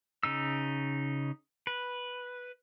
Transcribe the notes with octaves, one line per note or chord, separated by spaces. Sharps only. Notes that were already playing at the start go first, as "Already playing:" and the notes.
C#3 D#4 E6
B4